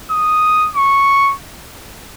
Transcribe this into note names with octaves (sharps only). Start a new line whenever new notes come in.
D#6
C#6